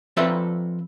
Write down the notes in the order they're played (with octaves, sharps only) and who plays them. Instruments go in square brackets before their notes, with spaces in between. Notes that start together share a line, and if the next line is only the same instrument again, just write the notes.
[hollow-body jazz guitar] F3 C4 A4 B4 D5 E5